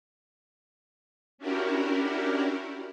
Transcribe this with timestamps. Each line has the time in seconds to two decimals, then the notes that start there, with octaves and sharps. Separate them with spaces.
1.38 C#4 D4 E4 F#4 G4 A#4